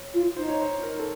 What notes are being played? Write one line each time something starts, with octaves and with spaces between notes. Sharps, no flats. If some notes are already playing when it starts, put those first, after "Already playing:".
Already playing: C#5
F4
D#4 C5
C#5
C5
A#4
A4